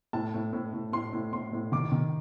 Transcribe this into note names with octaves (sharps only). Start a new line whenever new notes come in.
A2 A5
A2
A2
A2
A2 C6
A2
A2 C6
A2
D#3 D6
D#3